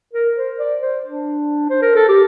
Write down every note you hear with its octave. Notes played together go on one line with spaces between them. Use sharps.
A#4
C5
D5
C5
D4
C5
A#4
A4
G4